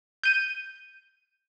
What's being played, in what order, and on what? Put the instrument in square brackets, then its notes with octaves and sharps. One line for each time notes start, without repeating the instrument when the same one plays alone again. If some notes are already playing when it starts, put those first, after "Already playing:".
[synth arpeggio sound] G6 D#7